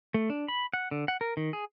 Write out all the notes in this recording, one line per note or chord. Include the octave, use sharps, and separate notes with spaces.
A3
D4
B5
F#5
D3
F#5
A#4
D#3
G#4